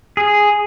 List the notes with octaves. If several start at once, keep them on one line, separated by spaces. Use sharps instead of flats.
G#4